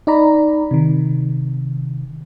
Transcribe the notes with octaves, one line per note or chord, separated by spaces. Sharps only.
D#4 D5 A#5 B5
C3 D#3